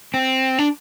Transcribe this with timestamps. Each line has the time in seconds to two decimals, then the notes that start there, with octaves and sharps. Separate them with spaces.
0.14 C4
0.59 D4